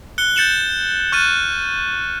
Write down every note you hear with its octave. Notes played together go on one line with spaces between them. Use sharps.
F#6 C#7 G7
G6 A6 C#7 E7 F#7
C#6 F6 F#6 A6 D#7